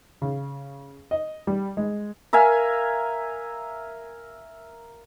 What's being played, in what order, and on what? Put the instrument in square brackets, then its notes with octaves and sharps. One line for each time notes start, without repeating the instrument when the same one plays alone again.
[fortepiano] C#3
D#5
G3
G#3
[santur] A#4 E5 F5 G#5